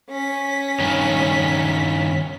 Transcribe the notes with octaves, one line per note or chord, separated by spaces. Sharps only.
C#4 B6
G2 D#3